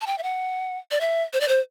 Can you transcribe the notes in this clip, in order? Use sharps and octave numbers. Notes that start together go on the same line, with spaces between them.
A5
G5
E5
F#5
D5
E5
C5
D5
C5